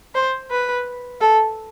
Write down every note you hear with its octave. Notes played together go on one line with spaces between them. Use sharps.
C5
B4
A4